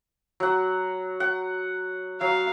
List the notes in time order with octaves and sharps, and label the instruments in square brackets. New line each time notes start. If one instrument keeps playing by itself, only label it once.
[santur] F#3 F#5
F#5
[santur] F#3 [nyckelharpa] F5